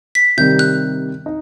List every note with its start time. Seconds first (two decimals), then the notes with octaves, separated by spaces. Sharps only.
0.15 B6
0.38 C3 D#3 G3 G6
0.59 F#6
1.26 D#4